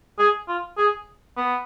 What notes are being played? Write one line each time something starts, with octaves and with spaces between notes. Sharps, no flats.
G#4
F4
G#4
B3